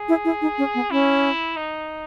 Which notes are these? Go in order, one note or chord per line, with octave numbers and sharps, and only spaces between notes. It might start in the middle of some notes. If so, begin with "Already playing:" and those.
Already playing: G#4
E4
E4
D#4
C#4
B3
C#4 E4
D#4